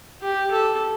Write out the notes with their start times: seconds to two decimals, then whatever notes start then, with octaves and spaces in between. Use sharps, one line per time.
0.21 G4
0.51 A4